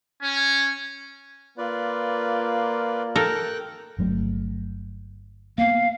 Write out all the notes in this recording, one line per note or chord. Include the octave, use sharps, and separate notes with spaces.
C#4
A#3 F4 B4 D5
A4 A#4 G5 F#6
G1 F#3 A3
A#3 B3 F5